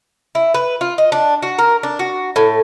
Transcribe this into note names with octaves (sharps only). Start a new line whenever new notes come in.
E4
B4
F4
D#5
D4
F#4
A#4
D4
F#4
A2